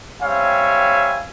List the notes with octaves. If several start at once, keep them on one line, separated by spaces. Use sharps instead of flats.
G3 C4 C#5 E5 F5 G#5